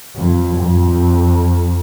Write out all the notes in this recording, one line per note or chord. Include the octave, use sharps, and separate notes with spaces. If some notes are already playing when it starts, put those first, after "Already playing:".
F2
F2